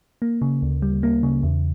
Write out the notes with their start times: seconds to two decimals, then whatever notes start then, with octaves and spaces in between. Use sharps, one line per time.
0.22 A#3
0.42 C#3
0.62 D2
0.82 G3
1.03 A#3
1.23 C#3
1.43 E2